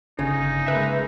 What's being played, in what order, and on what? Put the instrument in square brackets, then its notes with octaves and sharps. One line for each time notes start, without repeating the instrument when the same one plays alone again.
[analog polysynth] G1 [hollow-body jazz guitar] C#3 [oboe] D#4
[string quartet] G#3 A#3 G#4 [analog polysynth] B4 E5